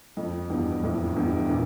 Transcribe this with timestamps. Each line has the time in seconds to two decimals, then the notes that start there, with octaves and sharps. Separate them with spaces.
0.17 F2
0.50 E2 G2
0.83 F2 A2
1.16 E2 G2
1.49 A#2 D3